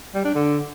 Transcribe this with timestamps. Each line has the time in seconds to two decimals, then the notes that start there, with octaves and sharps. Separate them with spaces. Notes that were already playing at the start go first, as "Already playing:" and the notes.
0.14 G3
0.25 D4
0.35 D3